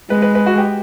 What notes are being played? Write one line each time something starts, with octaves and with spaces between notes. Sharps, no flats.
G#3 B4
B4
B4
F#4
G4